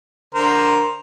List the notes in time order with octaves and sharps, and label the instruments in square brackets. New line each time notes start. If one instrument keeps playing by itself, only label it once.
[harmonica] D3 A#4 C5